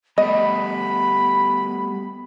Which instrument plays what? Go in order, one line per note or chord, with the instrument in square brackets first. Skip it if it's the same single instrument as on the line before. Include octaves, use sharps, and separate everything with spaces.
[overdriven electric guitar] G3 A3 [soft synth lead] B3 [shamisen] D#5 [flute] B5